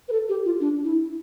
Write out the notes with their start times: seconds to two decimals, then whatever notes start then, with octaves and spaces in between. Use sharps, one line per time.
0.08 B4
0.12 A4
0.29 G4
0.45 F4
0.60 D4
0.84 E4